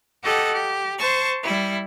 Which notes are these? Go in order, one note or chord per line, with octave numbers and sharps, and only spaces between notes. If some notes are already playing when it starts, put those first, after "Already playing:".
G4 A4 D#5 F#5
G4
C5 A5 C#6
G3 E4